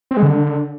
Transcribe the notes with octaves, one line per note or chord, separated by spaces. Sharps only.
C4
G#3
D3